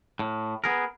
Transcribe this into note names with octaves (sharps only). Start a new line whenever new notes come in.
A2
B3 G#4 A#4